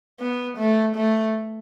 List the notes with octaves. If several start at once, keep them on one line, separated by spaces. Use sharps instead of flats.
B3
A3
A3